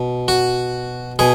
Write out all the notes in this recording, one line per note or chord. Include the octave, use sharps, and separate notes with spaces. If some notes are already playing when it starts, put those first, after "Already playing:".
Already playing: B2
F#4
B2 G#4